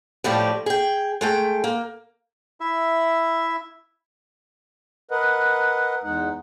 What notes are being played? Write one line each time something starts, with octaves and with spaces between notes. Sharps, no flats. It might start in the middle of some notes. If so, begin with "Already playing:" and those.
A2 F3 G3 G4
G#4 G5
G#3 A3 G5
A#3
E4 E5
A#4 B4 D#5 F#5
E2 G#3 D#4 F#5